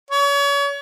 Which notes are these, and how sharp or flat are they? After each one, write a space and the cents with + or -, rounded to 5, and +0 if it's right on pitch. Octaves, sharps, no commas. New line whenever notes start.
C#5 +35